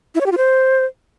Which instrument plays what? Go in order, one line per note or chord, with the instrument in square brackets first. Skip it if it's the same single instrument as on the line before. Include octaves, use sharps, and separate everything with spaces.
[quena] E4
C#5
G4
F4
C5